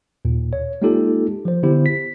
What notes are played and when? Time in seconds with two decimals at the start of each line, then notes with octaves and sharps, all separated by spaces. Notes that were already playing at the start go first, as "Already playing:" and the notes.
0.25 D#2 A#2
0.53 C#5
0.82 G#3 A#3 D#4 F4 G4 A4
1.45 F3 C5
1.63 D3 B3 E4 G4 C5
1.86 B6